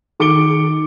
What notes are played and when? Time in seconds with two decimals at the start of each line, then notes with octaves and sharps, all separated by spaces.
0.20 D#3 D6 C#7 D7 G7